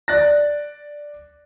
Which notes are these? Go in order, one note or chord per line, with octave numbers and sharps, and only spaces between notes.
D5 F#6 A6 A#6